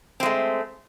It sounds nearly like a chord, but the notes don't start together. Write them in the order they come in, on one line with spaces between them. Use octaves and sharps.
C4 G#3 A3